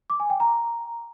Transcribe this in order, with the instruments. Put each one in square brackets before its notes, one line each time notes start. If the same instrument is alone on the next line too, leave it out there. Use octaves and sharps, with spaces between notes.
[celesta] D6
G#5
G5
A#5